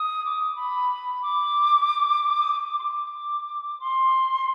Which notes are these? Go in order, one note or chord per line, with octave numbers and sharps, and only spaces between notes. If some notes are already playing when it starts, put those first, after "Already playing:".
Already playing: D#6
D6
B5
D6
D#6
D6
C6
D6
C6